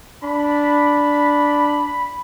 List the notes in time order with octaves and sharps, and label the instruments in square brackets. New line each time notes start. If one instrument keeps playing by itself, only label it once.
[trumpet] D4 [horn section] B5